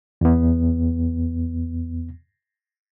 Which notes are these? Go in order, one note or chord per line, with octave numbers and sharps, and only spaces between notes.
E2 B3